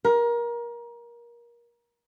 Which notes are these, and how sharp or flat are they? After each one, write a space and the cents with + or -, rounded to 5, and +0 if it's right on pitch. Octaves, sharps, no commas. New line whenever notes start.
A#4 +25